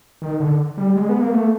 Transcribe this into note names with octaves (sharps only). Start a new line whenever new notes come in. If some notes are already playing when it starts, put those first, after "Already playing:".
D#3
D3
G3
G#3
B3
A#3
A3